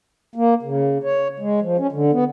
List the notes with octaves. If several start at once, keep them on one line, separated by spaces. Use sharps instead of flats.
A#3
C#3
C#5
G#3
F3
C#4
D3
B3